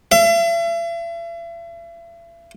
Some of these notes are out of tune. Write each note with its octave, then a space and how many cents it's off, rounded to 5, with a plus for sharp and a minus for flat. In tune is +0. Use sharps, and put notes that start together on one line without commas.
E5 +40